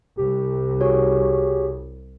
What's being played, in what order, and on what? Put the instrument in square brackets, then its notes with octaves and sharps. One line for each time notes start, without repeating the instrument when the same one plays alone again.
[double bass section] C2 [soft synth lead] G4
[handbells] F#4 G#4 C#5